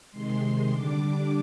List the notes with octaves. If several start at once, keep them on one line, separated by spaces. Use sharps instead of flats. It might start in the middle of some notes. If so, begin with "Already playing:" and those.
C3 D#3 G#3 C6
D3 G3 D4 D6
D6